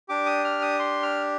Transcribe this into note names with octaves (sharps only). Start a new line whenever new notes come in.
D4 G4 D6
D#6
F6
D#6
C6
F6